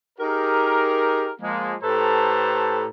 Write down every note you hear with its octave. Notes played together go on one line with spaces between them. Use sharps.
D#4 G4 G#4 A#4
F3 G#3 A#3
A2 G4 A4 B4 C5 A#5